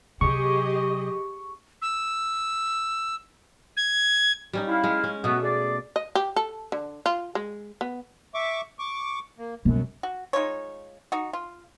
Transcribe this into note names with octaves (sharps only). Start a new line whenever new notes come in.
C3 F#3 G4 G#4 D#5 C#6
E6
G#6
G3 C#4 D#4
E4 F5
G#3
C#4
B2 A3 B3 F#4
G#4 D5
D#5
G4
A4
D3
F4
G#3
B3
E5 C#6 D6
C#6 D6
A#3
F#2 B2 G3
F#4
G#3 D#4 F4 C#5
D#4 F#4
F4